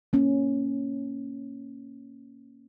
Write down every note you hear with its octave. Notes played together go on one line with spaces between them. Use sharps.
A#3 C#4